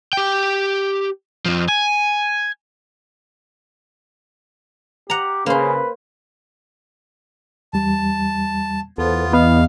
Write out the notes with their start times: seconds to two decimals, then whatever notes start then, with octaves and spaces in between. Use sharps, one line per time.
0.13 G4 G5
1.45 F2 F3
1.68 G#5
5.10 G4 F#5 A#5
5.46 C#3 A#3 B4 C5
7.73 E2 G3 A5
8.98 E2 B3 F4 A4 C5
9.33 B3 D#5 F5